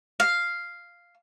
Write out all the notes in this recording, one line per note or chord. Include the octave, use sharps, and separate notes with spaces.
F5